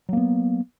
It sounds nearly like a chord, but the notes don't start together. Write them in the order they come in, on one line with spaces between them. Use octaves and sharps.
F#3 A#3 B3